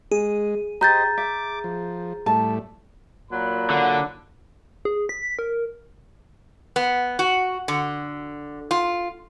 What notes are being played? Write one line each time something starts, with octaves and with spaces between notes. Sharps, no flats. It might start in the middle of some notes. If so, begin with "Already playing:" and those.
G#3 G#4
G4 C5 D#5 A#5 G6 A6
E5 D6
F3
A2 G3 A3 A5
A#2 F#3 B5
D3
G#4
B6
A#4
B3
F#4
D3
F4